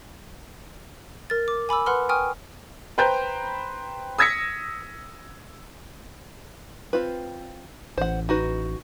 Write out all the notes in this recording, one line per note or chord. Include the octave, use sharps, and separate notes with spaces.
A#4 A6
D6
G#5 B5 D6 E6
B4 F#5 B5 C6 F6
G5 G#5 C#6 D#6 F6
B4 C5 G5 A#5 B5 G6
D#6 E6 G#6 A#6 B6 C#7
C4 F4 B4
A1 C5 F#5
D#4 F#4 B4